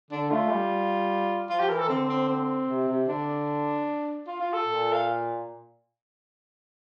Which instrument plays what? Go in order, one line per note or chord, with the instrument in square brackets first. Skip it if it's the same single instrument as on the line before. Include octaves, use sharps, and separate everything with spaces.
[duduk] D3 [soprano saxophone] D4
[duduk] A3 [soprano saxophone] F4
[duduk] G3
[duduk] F3 [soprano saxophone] F4
[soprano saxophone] G4
[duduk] E3 [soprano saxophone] A#4
[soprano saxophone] A4
[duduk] D3 [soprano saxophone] C4
[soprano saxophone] C4
C4
[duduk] C3
C3
[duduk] D3 [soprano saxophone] D4
[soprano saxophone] F4
F4
A4
[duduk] A#2
[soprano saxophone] F5